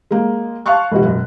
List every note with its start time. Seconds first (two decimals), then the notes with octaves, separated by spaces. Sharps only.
0.11 G#3 A#3
0.66 F5 A5 C6 C#6 F#6
0.91 E1 B2 F#4
1.05 F#2 B2